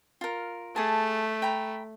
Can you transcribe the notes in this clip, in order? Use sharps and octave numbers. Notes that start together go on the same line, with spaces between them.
F4 A#4
A3 G#4 A5
G5 A#5 B5